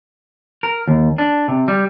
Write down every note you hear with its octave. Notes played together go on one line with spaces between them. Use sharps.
A#4
D#2
D4
C3
G3